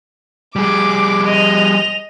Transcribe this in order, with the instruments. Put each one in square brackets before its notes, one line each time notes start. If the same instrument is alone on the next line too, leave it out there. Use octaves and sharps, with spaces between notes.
[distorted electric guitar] G3 G#4 [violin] D6
[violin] D#5 F7